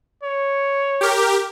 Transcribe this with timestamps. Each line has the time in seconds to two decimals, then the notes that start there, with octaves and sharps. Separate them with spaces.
0.23 C#5
1.01 G4 A#4